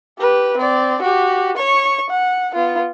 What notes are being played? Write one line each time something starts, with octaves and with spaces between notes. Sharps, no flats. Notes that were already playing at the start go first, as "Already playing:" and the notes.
G4 B4
C4 D5
F#4 G4
C#5 C#6
F#5
B3 F4